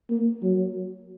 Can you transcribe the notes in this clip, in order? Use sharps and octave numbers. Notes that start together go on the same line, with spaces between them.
A#3
F#3